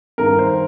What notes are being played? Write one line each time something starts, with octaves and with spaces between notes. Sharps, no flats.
G2 D#3 A#4
C5